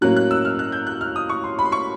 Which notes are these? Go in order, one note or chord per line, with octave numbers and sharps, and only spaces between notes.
A2 F#3 A#3 C#4 F#6
F#6
E6
F6
F#6
G6
F#6
F6
D#6
C#6
C6
B5
C6
C#6